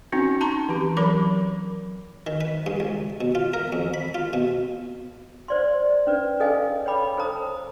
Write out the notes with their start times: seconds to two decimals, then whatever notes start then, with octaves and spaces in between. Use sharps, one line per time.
0.12 C4 C#4 D#4 F#4
0.41 A5 A#5 C6 C#6
0.69 E3 G4
0.97 F#3 A#4 B5 D6
2.27 D#3
2.41 B4
2.66 G2
2.80 C#2
3.21 B2
3.35 F4
3.54 A#4
3.73 F2
3.94 B5
4.15 F4
4.33 B2
5.48 C5 D5 C6
6.07 C#4 B4 D5
6.40 C#4 G#4 A4 D#5 F5 G#5
6.86 C#5 G5 B5 D6
7.17 A4 C5 A5 A#5 D#6